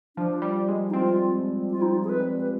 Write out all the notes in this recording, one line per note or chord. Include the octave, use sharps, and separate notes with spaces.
F3 D4
G3
G#3
D#4
C4 F4
F4
D#4
F4
G#4
B4
B4